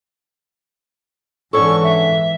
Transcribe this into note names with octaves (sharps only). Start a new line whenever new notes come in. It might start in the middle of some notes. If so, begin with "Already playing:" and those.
G#2 D3 E3 C#4 A4 C#6
E5